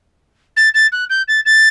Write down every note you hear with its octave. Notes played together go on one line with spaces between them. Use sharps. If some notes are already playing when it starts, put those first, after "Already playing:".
A6
A6
F#6
G6
A6
A6